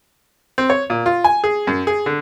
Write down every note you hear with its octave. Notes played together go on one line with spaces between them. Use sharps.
C4
C#5
A#2
F4
G#5
G#4
F#2
G#4
D3